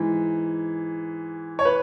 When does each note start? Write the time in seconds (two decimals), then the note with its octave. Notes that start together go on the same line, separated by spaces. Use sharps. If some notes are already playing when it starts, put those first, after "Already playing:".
Already playing: G#2 E3
1.59 C#5
1.65 B4